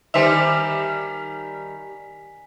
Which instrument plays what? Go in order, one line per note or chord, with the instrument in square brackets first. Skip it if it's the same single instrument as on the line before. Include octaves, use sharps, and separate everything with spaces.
[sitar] D#3 G3 D#4 [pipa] C5 E5 [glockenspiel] G#5 B6 F7